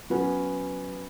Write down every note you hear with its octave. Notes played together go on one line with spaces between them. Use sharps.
F#3 B3 C#4